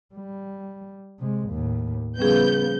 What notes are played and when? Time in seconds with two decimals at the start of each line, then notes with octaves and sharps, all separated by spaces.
0.15 G3
1.19 C3 G#3
1.50 D#2 A2
2.19 C#3 F3 G3 B3 C#4 G#4 G6